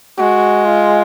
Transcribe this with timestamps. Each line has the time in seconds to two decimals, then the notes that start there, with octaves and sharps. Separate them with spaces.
0.18 G#3 F#4
0.65 F4